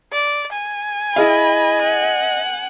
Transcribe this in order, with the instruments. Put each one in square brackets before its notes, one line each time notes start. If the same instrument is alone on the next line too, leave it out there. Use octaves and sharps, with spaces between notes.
[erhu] D5
G#5
[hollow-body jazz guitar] E4 G#4 F5 [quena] D#5 [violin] B5
[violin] F#5 F#6